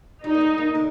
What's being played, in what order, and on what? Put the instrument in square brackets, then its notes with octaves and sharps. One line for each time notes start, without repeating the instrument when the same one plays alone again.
[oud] G3 [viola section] D#4
[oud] A#3
G#3
A#3
D3